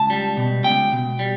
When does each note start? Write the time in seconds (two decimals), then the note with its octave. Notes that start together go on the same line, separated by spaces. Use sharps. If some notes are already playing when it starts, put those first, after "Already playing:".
Already playing: C#2 A5
0.10 G3
0.37 B2
0.64 C#2 G5
0.92 B2
1.19 G3